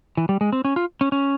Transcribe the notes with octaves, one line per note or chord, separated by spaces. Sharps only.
E3
G3
G#3
C4
C#4
F4
C#4
C#4